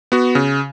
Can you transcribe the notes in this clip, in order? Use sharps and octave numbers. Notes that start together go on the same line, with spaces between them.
B3 F#4
C#3